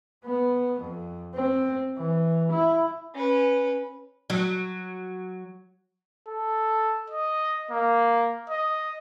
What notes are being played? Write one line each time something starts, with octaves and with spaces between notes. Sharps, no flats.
B3
F2
C4
E3
E4
C#4 B4
F#3
A4
D#5
A#3
D#5